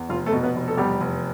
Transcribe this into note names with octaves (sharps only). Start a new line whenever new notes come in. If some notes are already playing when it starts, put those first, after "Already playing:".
Already playing: E2
F1 F4
A3 A4
B2
B3 B4
F1
A4
E2 G3 G4
F1